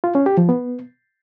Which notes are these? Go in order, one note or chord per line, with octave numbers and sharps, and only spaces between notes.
F4
C#4
G4
F3
B3